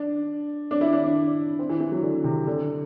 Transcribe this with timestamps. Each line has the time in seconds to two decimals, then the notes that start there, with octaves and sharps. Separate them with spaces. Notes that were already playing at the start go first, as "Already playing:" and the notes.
Already playing: D4
0.71 D4
0.81 E4
0.93 D4
1.04 D4
1.59 C4
1.69 E3
1.80 E3
1.92 F#3
2.03 D3
2.24 C3
2.47 D3